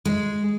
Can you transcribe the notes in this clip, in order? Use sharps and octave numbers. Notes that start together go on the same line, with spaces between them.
G#3